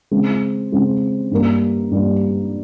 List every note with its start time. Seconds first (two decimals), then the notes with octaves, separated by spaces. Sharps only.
0.11 C#3 G#3 C4
0.72 C#3 G#3 C4
1.31 G2 G3 A#3
1.91 G2 G3 A#3